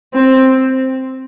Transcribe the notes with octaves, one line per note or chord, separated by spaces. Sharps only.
C4